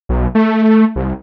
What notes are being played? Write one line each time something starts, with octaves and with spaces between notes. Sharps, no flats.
B1
A3
C2